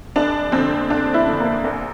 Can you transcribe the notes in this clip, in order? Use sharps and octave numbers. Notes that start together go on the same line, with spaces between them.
F1 D4
F2 D3 C4
F1 D4
E4
F2 D3
A#3
A#1